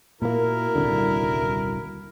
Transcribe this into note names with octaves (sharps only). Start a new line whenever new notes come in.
A#2 A#3 E4 F#4 A#4
D#1 C2 D3